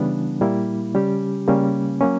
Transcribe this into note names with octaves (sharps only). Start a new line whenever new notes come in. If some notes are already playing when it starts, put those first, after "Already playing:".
Already playing: C#3 E3 G3 B3 D4
A#2 G3 A#3 E4
C#3 G3 C#4 G4
C#3 G3 A#3 C#4
F#3 A#3 C#4